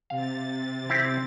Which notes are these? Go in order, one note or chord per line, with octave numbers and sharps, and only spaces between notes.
C3 F5 A6
C4 E4 G4